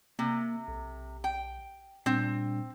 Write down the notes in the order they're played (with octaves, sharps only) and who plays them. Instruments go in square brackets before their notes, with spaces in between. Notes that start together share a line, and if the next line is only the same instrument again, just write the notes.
[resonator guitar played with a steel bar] C3 [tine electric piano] A#3
[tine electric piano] B1
[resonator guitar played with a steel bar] G5
[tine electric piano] A#2 G3 D4 [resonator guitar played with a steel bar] C4